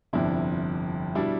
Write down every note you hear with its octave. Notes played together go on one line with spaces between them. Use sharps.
G1 F2 C3 D4 E4
B2 G3 D4 E4